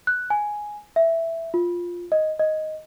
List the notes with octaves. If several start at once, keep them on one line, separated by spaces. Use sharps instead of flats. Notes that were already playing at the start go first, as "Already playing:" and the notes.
F#6
G#5
E5
F4
D#5
D#5